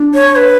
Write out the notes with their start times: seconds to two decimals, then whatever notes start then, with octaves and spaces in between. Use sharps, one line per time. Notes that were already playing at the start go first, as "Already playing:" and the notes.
Already playing: D4
0.14 C#5
0.36 B4